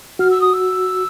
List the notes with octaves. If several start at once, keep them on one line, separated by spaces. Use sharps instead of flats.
F#4 F6
E6
D#6
E6